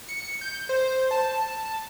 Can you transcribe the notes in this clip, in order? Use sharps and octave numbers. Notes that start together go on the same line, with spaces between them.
C#7
G6
C5
A5